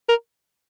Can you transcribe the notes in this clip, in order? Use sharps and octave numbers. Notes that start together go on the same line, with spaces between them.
A#4